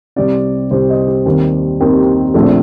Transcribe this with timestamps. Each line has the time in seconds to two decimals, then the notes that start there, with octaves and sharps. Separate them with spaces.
0.16 C2 C3 G3 C4 D5
0.71 C2 C3 G3 C4 C5
0.89 D#5
1.08 G4
1.26 D#2 D#3 G3 C4
1.80 D#2 D#3 G3 C4
2.34 A#1 A#2 A3 C4 A4